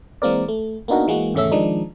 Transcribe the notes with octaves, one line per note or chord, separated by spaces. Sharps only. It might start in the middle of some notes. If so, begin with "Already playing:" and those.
E3 G#3 A#3 C4 A#4 D5
A3
A#3 B3 D4 D#4 F#4 A#4
E3 G#3 A#3 F#4
G#1 E2 C#3 A3 C#4 E5
D#3 F3 G#3 D4 D#4